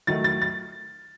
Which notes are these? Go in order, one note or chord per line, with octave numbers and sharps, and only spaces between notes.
D#3 F#3 A3 A6
A6
A6